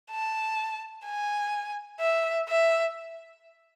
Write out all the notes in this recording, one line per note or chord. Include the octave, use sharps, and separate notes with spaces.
A5
G#5
E5
E5